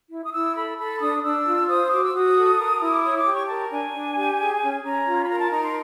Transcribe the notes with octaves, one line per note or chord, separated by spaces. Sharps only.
E4
D#6
E4 E6
A4 B5
A4 B5
D4 D#6
D4 E6
F4
C5 D#6
F#4 D6
E6
F#4 D#6
A4
A#4
E4
D6
C#5 D#6
D6
G4
C#6
A#4 A5
D4 G#5
D4
G4
G#4
C#4
C#4 A#5
F4
B5
A#4 A#5
A5
D#4 A#5
C6